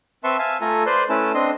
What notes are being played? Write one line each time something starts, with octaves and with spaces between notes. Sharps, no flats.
C4 B4 E5 A5 C6 C#6
E5 F5 G#5 A5
A3 F4 A4 G#5 A#5
B4 C5 D5 C6
A3 C#4 E4 B4 A5
C4 D4 D#5 C6